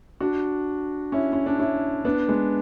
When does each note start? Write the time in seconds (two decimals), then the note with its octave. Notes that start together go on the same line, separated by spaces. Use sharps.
0.20 D4 F#4
1.12 C#4 E4
1.33 C#4
1.46 D4
1.59 C#4 E4
2.05 B3 D4
2.29 G#3 B3